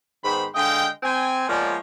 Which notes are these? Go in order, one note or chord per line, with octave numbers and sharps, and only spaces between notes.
G#2 D#3 B3 C5 B5
D3 G#3 D#5 F5 G5
C4 G#5
F3 G#3 A#3 B3 C#5 D5